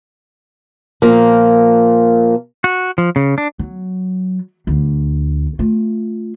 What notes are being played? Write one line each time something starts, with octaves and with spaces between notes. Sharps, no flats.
A#2 F3 A#3
F#4
F3
C#3
D4
F#3
D2 D4
A3 F4